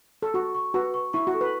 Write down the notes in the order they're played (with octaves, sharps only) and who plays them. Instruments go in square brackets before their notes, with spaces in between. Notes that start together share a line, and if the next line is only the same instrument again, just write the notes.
[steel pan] A4
[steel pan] F#4 [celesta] C#6
[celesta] C#6
[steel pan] F#4 [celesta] B4
[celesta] C#6
[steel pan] E4 [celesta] C#6
[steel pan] F#4
[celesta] A4
[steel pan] B4